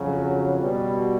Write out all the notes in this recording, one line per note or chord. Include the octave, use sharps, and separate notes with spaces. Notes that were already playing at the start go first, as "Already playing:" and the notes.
Already playing: F2 C#3 F#3
B2 G3